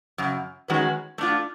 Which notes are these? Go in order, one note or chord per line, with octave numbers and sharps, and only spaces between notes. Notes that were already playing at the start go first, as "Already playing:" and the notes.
F#2 C#3
D#3 G#3 C#4 F#4 B4
A3 D4 F4